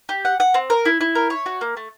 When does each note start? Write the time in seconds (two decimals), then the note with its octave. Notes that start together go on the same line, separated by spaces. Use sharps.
0.09 G4
0.25 F#5
0.40 F#5
0.54 C4
0.70 A#4
0.85 E4
1.01 E4
1.15 A#4
1.30 C#5
1.46 F#4
1.61 A#3
1.77 A3